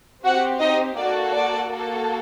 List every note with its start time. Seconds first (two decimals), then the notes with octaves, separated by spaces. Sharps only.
0.24 C4 F#4 G4 F#5
0.61 D#4 D#5
0.97 A#3 F#4 A4 D5
1.33 D5
1.70 A#3 F#4 A4